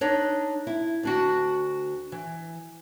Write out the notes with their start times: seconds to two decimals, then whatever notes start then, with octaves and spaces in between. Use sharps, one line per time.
0.01 D4 D#4 C#5 D#5
0.67 E4
1.03 D2 D4 F#4
2.12 E3